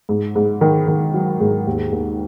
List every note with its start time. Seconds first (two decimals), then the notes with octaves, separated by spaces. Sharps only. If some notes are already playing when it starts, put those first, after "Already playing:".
0.09 G#2
0.35 G#2
0.61 D#3
0.88 D#3
1.14 F#3
1.40 G#2
1.67 D#2
1.92 D#2